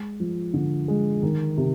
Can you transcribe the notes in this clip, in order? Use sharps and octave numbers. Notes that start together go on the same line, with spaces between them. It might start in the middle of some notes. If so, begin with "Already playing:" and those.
Already playing: G#3
F3
D3
G#3
D#3
C3